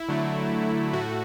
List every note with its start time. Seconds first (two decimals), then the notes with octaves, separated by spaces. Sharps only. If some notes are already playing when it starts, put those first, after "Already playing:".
Already playing: E4
0.09 D3 F#3 A3
0.93 A2 A3 F#4